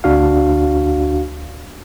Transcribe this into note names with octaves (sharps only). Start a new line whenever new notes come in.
D2 D4 F#4 F5